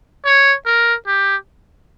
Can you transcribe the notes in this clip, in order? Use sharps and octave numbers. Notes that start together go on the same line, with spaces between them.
C#5
A#4
G4